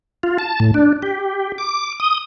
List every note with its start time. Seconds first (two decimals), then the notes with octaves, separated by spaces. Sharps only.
0.23 F4
0.39 A5
0.60 A2
0.74 D4
1.02 G4
1.58 D6
2.00 D#6